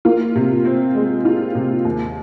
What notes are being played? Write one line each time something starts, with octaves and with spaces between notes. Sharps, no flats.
A#3 F4
C3
C4
G#3
F4
C3
D#2